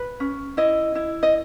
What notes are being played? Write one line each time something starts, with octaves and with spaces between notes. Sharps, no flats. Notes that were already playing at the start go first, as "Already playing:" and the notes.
Already playing: B4
C#4
E4 D#5
E4
D#5